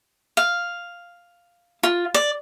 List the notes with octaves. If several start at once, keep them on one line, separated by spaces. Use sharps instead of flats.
F5
F4
D5